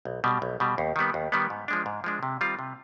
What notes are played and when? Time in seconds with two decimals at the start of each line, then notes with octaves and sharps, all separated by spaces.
0.05 B1
0.24 B2 G3
0.42 B1
0.60 B2 G3
0.78 D#2
0.96 D#3 G3 B3
1.14 D#2
1.32 D#3 G3 B3
1.50 G#2
1.68 F3 G#3 D4
1.86 G#2
2.04 F3 G#3 D4
2.23 C3
2.41 D#3 G3 C4 F4
2.59 C3